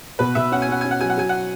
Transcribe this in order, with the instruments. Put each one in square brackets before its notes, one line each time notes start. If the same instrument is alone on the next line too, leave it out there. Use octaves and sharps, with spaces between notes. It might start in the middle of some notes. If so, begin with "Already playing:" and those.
[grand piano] B2 [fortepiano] B4
[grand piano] B2 [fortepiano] E5
[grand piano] C#4 [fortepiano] F#5
[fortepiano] G#5
[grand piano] C#4 [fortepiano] F#5
[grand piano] C#4 [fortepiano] G#5
[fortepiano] F#5
[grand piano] F#3 [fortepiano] G#5
[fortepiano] F#5
[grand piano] F#3 [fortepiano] G#5
[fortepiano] F#5